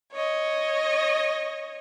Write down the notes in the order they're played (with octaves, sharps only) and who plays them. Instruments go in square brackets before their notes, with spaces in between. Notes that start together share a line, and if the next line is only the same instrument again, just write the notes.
[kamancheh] C#5 D#5